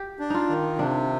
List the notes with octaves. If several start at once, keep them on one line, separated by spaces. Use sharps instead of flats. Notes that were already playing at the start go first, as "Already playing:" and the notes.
Already playing: G4
D4
D#4 F4
D#3
C3 D4